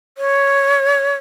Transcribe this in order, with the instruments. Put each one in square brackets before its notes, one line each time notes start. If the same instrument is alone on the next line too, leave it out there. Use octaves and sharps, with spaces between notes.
[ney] C#5